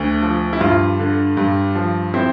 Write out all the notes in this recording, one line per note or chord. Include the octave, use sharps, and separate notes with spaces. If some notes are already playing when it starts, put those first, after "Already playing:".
Already playing: D2 D3
F3
E4
G2 F4
D3
G2
F3
C4 E4